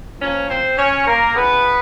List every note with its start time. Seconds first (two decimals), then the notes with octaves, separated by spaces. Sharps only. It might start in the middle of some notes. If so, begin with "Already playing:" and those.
0.20 A#2 F3 C#4 C#5
0.49 C4 C5
0.78 C#4 C#5
1.07 A#3 A#4
1.35 C#3 E3 B3 B4